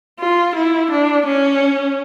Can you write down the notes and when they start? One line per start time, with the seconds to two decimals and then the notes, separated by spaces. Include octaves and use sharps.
0.20 F4
0.55 E4
0.91 D4
1.26 C#4